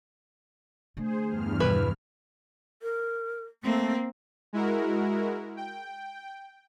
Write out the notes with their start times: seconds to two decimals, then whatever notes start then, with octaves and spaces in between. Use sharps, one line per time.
0.97 D3 A3 G#4 C5
1.28 E2 G2 F6
1.60 B2 D#3 E4 B4
2.82 A#4
3.64 A3 A#3 C4
4.53 G#3 E4 F#4 A#4
5.57 G5